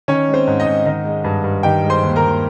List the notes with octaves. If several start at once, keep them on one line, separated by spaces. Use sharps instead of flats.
D#3 C#4 C#5
G#3
C4 C5
G#2
D#4 D#5
G#2
D#3 D#4 D#5
G#3
G2
G2
D#3 G4 G5
G#3
C5 C6
D#2
A#4 A#5
D#2